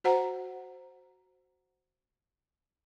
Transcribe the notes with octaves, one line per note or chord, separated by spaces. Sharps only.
F#4 C5 F#5 A#5